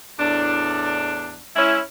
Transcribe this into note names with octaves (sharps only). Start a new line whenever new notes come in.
E2 A2 D4
G#3 C#4 E4